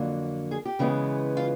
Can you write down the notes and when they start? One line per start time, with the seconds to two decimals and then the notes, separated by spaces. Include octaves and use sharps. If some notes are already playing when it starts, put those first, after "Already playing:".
Already playing: F2 D3 F#3 A#3
0.51 G#4
0.65 G4
0.79 C#3 E3 G#3 B3
1.37 F4